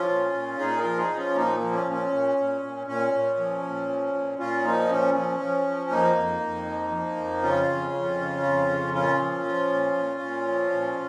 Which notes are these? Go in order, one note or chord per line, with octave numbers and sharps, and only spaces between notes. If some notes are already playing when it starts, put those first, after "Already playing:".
Already playing: F3 C#4 F4
A#2
A#2
A#2 D#4 G#4
F4 A#4
F3
D#4 G#4
F3
C#4 F4
A#2 A#3 D#4
A#3
F3
C#4
A#2
C#4
A#2
A#2
A#2
A#2 C#4
A#2
F3
A#2
F3
A#2
A#2 C#4 F4
F3 A#3 D#4
A#2 C#4
F3 C#4
F3
F3
F2 A#3 D#4
F2
F2
F3
F3
F2
C#3 C#4 F4
F2
F2
C#3
F2
C#3
A#2 C#4 F4
F3
F3
A#2
A#2
A#2
F3
A#2